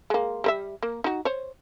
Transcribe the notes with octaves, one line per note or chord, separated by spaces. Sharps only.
G#3 A#3
G3 A#4 E5
A#3
D#4 F#4
C5 C#5